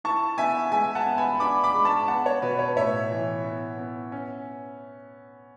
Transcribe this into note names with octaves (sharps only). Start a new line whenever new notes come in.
E4 A5 C#6
B3 E5 G#5
G#3 E5 G#5
F#5 A5
B3
G#5 B5
D4 B5 D6
B5 D6
G#3
A5 C#6
B3 F#5 A5
C#5
B2 B4
C#5
A2 C#5 E5
E3
B3
B3
C#4